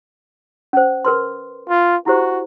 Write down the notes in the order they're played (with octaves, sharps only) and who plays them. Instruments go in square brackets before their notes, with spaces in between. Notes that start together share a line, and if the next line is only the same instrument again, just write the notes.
[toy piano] C#4 C5
A#4 B4 C6
[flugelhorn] F4
[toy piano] E4 G4 C5 [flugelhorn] F#4